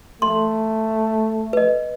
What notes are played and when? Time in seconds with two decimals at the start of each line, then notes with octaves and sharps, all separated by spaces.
0.22 A3 C6
1.53 B4 D#5